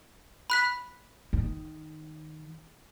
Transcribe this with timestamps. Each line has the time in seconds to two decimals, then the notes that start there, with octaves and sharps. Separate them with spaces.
0.50 B5 F#6 B6
1.33 D#3